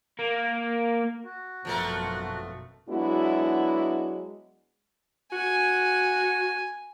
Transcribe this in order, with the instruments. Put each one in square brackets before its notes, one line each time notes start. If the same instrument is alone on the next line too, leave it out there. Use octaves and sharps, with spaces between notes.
[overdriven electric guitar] A#3
[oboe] F#4
[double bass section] G#1 F#2 B2 [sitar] F3 A3 A#4
[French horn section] F#3 G#3 B3 D4 E4 F#4
[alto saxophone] F#4 [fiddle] G#5